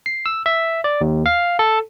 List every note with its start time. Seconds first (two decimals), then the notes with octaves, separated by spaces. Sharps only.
0.06 C7
0.26 E6
0.46 E5
0.84 D5
1.01 D#2
1.26 F5
1.59 A4